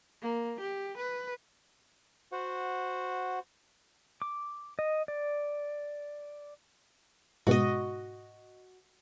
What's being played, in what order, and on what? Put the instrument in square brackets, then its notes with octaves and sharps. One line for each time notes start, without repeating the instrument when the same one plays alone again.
[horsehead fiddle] A#3
G4
B4
[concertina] F#4 C5 F#5
[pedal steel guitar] D6
D#5
D5
[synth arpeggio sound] G#2 B2 [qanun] F#4 D#5